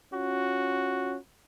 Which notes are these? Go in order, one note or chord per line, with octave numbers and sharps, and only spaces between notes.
C#4 F4 F#4